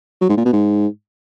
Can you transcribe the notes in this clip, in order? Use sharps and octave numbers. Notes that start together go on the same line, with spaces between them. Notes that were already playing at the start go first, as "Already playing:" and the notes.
F#3
G#2
A#2
B2
G#2